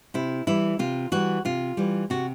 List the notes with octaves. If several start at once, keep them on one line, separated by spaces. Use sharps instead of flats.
C3 E4
E3 G3 E4
C3 F4
E3 G3 F#4
C3 F4
E3 G3
C3 F#4